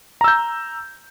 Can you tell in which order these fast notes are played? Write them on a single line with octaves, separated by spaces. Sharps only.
A#5 E6 G6